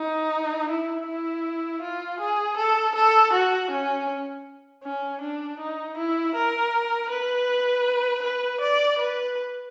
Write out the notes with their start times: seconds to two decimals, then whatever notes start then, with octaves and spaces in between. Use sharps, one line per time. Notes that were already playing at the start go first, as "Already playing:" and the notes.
Already playing: D#4
0.69 E4
1.06 E4
1.82 F4
2.20 G#4
2.57 A4
2.95 A4
3.33 F#4
3.71 C#4
4.83 C#4
5.21 D4
5.59 D#4
5.97 E4
6.35 A#4
7.09 B4
8.23 B4
8.61 D5
8.99 B4